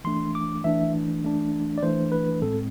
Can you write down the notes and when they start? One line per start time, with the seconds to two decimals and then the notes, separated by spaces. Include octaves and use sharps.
0.04 E3 A3 D4 C6
0.35 D6
0.64 E3 A3 D4 E5
1.23 E3 A3 D4
1.78 D5
1.82 E3 A3 D4 C5
2.12 B4
2.42 A2 G#3 C4 A4